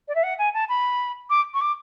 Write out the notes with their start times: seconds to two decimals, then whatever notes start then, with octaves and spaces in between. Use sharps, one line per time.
0.08 D5
0.15 E5
0.23 F#5
0.38 G#5
0.53 A5
0.68 B5
1.30 D6
1.53 C#6
1.61 D6